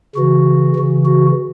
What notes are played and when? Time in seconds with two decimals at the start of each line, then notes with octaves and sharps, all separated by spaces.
0.15 C#3 E3 F#4
0.76 C#3 E3
1.05 F#4